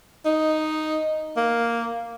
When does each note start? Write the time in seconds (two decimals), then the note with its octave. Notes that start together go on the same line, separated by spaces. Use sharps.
0.25 D#4
1.36 A#3